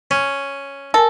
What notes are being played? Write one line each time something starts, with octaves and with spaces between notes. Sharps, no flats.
C#4
A4 A#4 G#5